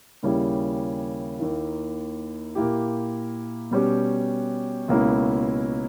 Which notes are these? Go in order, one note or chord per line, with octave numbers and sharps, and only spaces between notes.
D#2 C#3 G3 C#4 E4
D#2 D#3 A#3 E4
A#2 A#3 E4 G4
B2 G3 C#4 G4
C#2 B2 A#3 C#4 E4